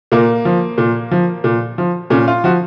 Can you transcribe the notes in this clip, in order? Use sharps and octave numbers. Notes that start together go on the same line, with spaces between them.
A#2 A#3
F3
A#2
F3
A#2
F3
A#2 C#4
F4
F3 F#4